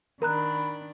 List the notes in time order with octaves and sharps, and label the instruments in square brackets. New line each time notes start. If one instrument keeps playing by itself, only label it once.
[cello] D#3 D4 [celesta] A#4 A#5 F#6 [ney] B5